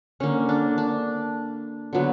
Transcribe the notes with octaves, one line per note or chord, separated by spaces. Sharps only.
D3 A#3 C#4
D4
D4
D3 F#3 B3